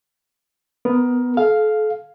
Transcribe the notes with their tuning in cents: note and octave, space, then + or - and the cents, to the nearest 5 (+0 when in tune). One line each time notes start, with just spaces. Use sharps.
B3 +5 A#4 +20
A4 -40 F5 +0